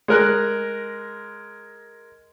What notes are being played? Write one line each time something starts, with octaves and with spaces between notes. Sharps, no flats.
G#3 A#4 F#6